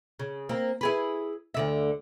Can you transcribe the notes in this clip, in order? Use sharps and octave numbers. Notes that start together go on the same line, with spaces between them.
C#3
A#3 C4
E4 G#4 B4
D2 D3 E5